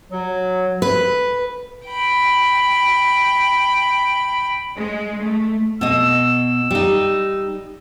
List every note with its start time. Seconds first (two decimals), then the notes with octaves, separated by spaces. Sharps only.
0.12 F#3
0.82 B4
1.87 G5 B5
4.75 G#3
5.22 A3
5.81 B2 D#5 E6
6.71 G3 D#4